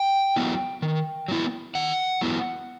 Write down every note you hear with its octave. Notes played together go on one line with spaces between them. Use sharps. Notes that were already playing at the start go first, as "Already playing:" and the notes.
Already playing: G5
F#3 B3 E4
D#3
F#3 B3 E4
D#3 F#5
F#3 B3 E4